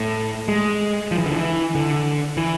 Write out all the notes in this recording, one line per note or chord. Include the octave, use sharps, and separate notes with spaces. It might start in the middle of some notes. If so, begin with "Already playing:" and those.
Already playing: A2
G#3
F3
E3
D3
E3
D3
E3